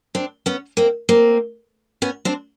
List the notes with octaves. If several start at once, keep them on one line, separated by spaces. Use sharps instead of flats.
C4 D4
B3 C#4
A#3 C4
A#3 C4
B3 C#4
C4 D4